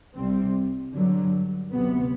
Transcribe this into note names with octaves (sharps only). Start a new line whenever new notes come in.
C2 C3 G3 C4
G2 D3 F#3
D2 C3 F#3 B3